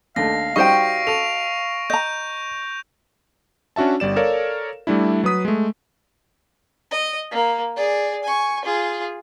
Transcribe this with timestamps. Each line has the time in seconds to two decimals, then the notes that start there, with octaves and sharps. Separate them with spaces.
0.16 D#2 A3 D4 F5 A#6
0.56 G3 D#4 F#4 C5 D#5 G5 C#6 D7
1.07 A4 C#6 F7
1.90 D#5 A#5 G6
3.76 C#4 D4 F#4 E5 A5
4.00 G1 G3 D5 E7
4.16 A4 A#4 C#5 D5 F5
4.87 G3 A3 D4 E4
5.24 F#3 B4 D#6 B6
5.45 G#3 A3
6.91 D#5
7.32 A#3
7.76 G#4 D5
8.23 G#5 C#6
8.65 F4 G#4